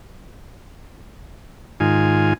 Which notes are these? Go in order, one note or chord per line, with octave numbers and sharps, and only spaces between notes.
G#2 D#3 F4 G#5